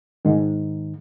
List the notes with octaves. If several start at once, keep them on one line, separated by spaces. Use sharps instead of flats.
G#2 D#3